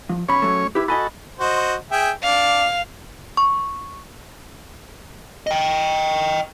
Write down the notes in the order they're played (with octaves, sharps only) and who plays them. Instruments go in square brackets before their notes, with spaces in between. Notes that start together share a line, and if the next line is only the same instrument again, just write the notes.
[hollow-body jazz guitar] F3
[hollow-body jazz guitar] B1 B5 [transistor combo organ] C#4 C#5
[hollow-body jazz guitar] F#3 A3
[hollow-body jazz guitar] E4 G4 [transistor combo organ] B4
[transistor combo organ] F#4 A4 [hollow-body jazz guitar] D#5 G#5 B5
[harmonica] F#4 C5 D#5
G#4 E5 G5
[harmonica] D4 [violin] F5
[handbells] C#6
[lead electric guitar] D#5 G5